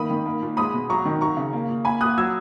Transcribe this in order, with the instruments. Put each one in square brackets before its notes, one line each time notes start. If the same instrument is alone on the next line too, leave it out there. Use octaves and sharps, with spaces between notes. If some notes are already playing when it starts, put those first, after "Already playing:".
Already playing: [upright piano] D#3 A#3 B5 D#6
D#3
A#3
A#2
G#3 B5 D#6
B2
F#3 A#5 C#6
D#3
F#3 A#5 C#6
C#3
A#3
A#2
A#3 G#5 B5
A#2 D#6 F#6
F#3 E6 G#6